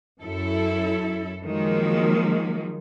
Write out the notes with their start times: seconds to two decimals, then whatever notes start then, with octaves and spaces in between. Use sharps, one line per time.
0.23 F#2 E4 A4
1.45 D#3 F3 F#3 G#3 A#3